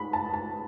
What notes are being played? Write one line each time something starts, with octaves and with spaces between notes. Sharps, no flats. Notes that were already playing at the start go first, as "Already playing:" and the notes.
Already playing: G#2 B5
A5
A5